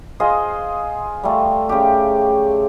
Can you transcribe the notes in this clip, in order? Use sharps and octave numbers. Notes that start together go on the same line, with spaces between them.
F4 G#4 C5 D#5
G3 A3 F4
C#3 G4